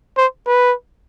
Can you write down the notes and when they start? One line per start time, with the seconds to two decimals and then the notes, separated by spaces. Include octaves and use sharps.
0.17 C5
0.47 B4